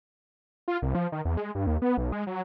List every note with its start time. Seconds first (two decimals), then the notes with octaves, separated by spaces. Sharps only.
0.68 F4
0.82 C2
0.95 F3
1.12 D#3
1.25 E2
1.37 G#3
1.55 G2
1.67 D#2
1.82 B3
1.97 B1
2.12 G#3
2.27 F#3